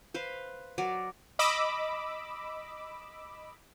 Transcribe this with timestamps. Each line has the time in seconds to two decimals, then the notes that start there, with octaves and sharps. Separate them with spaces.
0.14 B4 C5 F5
0.78 F#3 A#4 D5
1.39 D#5 B5 D6 E6